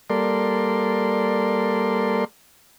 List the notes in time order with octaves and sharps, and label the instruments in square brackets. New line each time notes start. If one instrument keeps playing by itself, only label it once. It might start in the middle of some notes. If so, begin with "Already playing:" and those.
[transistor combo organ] G3 A#3 A4 A#4 D5 C6